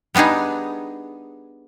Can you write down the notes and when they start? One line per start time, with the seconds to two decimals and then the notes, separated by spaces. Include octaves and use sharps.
0.15 G3 B3 D4 D#4 G#4